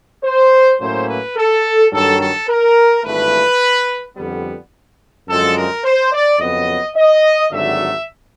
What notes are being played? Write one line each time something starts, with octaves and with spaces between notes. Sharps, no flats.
C5
A2 F#3 A#3 C#4 E4 C5
B4
A4
G2 D#3 F#3 A4
A4
A#4
G#1 G2 E3 A3 B4
F2 D3 G3 B3
F#2 D3 F3 G#3 C4 A4
A#4
C5
D5
F2 C#3 F#3 B3 D#5
D#5
G#1 G2 D3 F#3 A3 E5